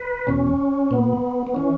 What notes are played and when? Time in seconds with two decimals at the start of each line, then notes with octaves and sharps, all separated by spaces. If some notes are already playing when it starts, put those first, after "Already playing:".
Already playing: B4
0.27 E2 B2 C#4
0.91 A#2 B3
1.47 B3
1.55 E3 C#4